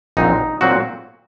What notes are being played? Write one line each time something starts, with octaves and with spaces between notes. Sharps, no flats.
A#1 A#2 F#3 C4 D#4
A#2 F#3 C4 F#4